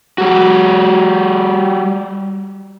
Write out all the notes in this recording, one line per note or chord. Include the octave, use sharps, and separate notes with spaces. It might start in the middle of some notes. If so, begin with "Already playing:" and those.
G3 F#4